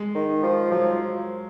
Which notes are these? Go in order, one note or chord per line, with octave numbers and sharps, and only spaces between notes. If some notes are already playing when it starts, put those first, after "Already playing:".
Already playing: G#3
D#3
F3
F3 F#3